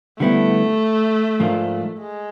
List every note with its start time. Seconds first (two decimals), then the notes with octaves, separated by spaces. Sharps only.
0.20 D3 G3 A3 B3 E4
1.40 G#2 F3 A#3 D4 F4
1.99 G#3